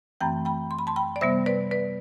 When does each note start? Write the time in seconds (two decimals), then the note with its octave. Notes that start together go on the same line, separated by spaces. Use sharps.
0.21 F#2 E3 A3 C4 G5 B5
0.45 G5 B5
0.71 C6
0.79 B5
0.87 A5 C6
0.96 G5 B5
1.16 D5
1.21 C3 G3 B3 C5 E5
1.46 B4 D5
1.71 B4 D5